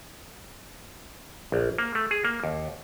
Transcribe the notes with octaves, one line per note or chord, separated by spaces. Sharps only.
A#1
A#3
A3
G#4
A#3
D#2